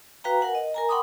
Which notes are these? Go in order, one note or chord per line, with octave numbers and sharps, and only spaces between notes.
F#4 B4 F5 G5 A#5
A#4 F#5 G#5
D#5
A#4 G#5 A#5
F#5 G5 B5 C6 D6 D#6